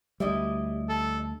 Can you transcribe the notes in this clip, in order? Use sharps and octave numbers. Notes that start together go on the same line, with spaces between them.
D2 G3 E4 D5 D#5
A4